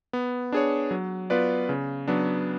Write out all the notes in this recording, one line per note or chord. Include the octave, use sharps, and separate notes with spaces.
B3
D4 G#4 C#5
F#3
B3 F4 B4 D5
C#3
F#3 B3 D4